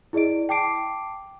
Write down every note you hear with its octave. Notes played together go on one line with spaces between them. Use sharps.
E4 G#4 D5 D#5 D7
G5 A5 D6 C7 D7